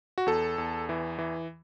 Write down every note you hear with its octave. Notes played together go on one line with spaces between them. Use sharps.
F#4
E2 A4
E2
E3
E3